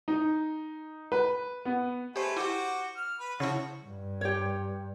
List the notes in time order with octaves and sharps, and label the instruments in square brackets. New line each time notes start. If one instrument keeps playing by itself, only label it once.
[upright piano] D#4
B4
B3
[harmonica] G#3 A3 B4 [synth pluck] G4 C5
[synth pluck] E4 G4 [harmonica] F#4 C5 D6
[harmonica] F6
B4
[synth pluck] C#3 E4 [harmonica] F3 F#4
[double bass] G2
[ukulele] G4 C#5